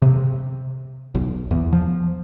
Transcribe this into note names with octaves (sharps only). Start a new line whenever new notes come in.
C3
B1
E2
F3